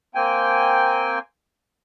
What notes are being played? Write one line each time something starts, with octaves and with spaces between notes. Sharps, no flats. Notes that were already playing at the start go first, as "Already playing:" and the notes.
A#3 C4 G5 G#5